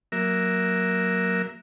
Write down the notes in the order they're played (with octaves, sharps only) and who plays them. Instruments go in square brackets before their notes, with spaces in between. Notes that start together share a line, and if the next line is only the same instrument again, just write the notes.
[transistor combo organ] F#3 A#3 A#4 E5